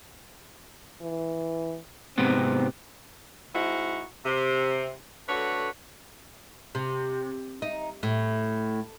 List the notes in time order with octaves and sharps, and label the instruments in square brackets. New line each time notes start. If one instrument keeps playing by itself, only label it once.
[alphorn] E3
[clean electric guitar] G#2 C3 B3 [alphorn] C4
[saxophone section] G#3 C4 D#4 E4 F#4
C3
D3 A3 F#4 B4 C#5
[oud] C3
D#4
A2